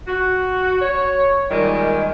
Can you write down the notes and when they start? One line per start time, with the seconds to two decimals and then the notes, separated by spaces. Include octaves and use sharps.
0.07 F#4
0.81 C#5
1.51 A#2 D#3 G3 G#3